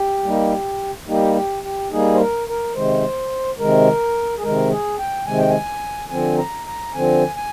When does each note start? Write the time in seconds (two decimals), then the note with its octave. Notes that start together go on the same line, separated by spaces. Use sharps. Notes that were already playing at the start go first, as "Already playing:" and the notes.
Already playing: G4
0.24 G3 A#3 D#4
1.08 G3 A#3 D#4 G4
1.35 G4
1.63 G4
1.91 G3 A#3 D#4 G#4
2.14 C5
2.20 A#4
2.48 A#4
2.75 C3 D#3 G#3 C5
3.59 C3 D#3 G#3 A#4
4.38 G#4
4.43 C3 D#3 G#3 A#4
4.71 G#4
4.99 G5
5.26 C3 D#3 G#3 G#5
5.38 G5
5.50 G#5
6.10 D3 F3 C4 G#5
6.38 A#5
6.67 A#5
6.94 D3 F3 C4 G#5
7.36 G#5